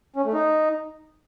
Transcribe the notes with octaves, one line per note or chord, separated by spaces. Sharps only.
C#4
A3
D#4